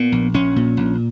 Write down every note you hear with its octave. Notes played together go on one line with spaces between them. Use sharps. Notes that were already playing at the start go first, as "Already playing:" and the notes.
Already playing: A#2 B3
A#1
A#1 C#4
A#2
A#1